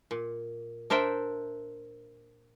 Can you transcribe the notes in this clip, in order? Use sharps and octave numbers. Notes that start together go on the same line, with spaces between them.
A#2
D4 A#4 C5 E5 G5